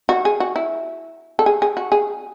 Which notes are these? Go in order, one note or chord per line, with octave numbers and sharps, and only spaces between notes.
F#4
G#4
F#4
E4
A4
G#4
G#4
F#4
G#4